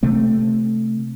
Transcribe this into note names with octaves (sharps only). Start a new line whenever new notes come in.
C3 A3 C4